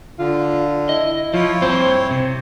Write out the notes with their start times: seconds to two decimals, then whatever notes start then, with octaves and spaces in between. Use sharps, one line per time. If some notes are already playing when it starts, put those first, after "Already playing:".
0.19 D3 F4
0.89 E4 D#5
1.34 F3 E4 F4 C#5
1.61 G2 C4 C5
2.11 C3